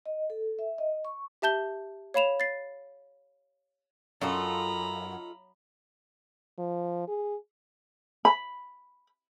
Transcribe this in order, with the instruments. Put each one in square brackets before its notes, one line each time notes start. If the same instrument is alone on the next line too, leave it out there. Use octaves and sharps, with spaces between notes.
[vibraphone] D#5
A4
E5
D#5
C#6
[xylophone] G4 E5 A5 G6 G7
C#5 F5 B5 E7 F7
A6 C7
[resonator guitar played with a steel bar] F#2 [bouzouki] D#4 F4 A4 [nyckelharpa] A#5 B5
[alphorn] F3
G#4
[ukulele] B5